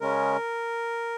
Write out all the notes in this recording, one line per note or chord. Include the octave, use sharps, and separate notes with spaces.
C#3 G#3 C#4 A#4